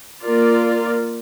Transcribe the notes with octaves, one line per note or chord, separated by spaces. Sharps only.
A#3 F4 A#4 D5